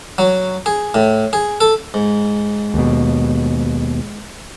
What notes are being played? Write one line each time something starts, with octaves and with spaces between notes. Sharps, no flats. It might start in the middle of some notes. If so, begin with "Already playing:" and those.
F#3
G#4
A2
G#4
A4
G#2
D#2 B2